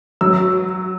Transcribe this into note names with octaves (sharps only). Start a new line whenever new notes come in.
F#3 E6